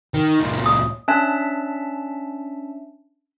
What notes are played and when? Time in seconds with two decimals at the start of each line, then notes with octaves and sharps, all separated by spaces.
0.14 D#3
0.40 C#2 A#2
0.66 D#6
1.08 C#4 D4 E5 A5